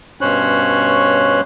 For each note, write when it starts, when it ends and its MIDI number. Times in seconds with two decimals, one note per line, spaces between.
0.21 1.41 43
0.21 1.41 47
0.21 1.41 61
0.21 1.41 72
0.21 1.41 73
0.21 1.41 90